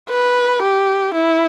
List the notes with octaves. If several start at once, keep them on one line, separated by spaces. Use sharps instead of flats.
B4
G4
E4